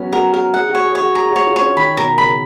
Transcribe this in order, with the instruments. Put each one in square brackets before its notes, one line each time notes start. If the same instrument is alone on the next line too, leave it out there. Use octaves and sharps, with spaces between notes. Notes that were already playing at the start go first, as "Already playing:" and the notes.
Already playing: [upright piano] F#3 B3 C#4
[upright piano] F#4 [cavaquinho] A#4
[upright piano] F#4 [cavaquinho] A#4
[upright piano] G#4 [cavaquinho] F#5
[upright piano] F#4 [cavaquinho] C#5
[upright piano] G#4
[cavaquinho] C#5
[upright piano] F#4
[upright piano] G#4 [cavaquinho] A#5
[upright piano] F#4 [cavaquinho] C#5
[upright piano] F4
[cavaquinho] C#5
[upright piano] C#4
[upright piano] D#3 [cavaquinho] B5
[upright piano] B2 [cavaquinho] A#4
[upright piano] C#3 [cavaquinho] B5